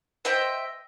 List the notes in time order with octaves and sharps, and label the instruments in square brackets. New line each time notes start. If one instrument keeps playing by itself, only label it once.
[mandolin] C5 D#5 E5 G5